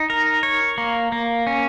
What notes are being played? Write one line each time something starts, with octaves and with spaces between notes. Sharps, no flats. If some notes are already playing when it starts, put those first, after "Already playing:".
Already playing: D#4
A#4
C#5
A#3
A#3
C#4